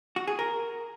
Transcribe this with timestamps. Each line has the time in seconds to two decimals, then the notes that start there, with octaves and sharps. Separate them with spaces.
0.16 F#4
0.28 G#4
0.39 A#4